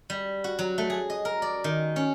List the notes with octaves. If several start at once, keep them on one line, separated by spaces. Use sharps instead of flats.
G3
F#4
F#3
A3
G#4
D#5
A#4
D5
D#3
C#4